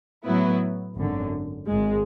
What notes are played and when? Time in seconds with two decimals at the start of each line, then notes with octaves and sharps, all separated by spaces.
0.25 A2 F#3 B3 E4 B4
0.96 G#1 F#2 D3
1.67 G#1 G#2 G#3